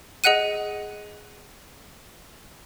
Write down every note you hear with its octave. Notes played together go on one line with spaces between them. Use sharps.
G#4 D#5 F#5 F#6 D#7